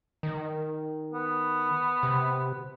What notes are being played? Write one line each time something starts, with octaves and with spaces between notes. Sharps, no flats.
D#3
B3
C3